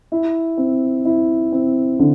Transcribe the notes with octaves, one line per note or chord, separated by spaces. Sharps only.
E4
C4
E4
C4
D3